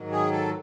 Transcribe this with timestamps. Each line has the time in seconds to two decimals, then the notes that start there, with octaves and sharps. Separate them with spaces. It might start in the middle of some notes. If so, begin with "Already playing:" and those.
Already playing: G#2 D#3 F#3
0.12 G#4
0.32 A4